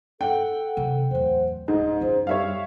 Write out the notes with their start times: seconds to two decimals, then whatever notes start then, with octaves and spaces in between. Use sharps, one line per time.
0.21 A4 F#5 G5
0.77 C3 D#3
1.11 D1 E2 C5
1.68 D1 G#2 D#5
2.01 F#2 F4 C5
2.27 G3 C#5 E5 F5